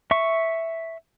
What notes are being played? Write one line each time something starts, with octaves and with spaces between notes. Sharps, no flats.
E5 C#6